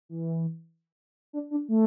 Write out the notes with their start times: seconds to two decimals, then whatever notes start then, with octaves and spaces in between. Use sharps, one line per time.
0.09 E3
1.33 D4
1.51 D4
1.69 A3